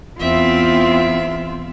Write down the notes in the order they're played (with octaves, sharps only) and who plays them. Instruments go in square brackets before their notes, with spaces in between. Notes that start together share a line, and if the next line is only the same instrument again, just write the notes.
[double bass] E2 [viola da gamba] B3 C4 E4 [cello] F4 [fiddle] E5